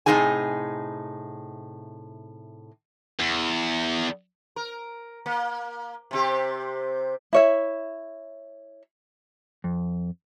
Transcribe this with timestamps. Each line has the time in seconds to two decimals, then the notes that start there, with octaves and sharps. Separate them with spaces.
0.06 A2 C3 F3 D#4 G#4 G#5
3.20 E2
4.56 A#4
5.26 A#3
6.11 C3 C4 G4
7.33 E4 C#5 E5
9.64 F2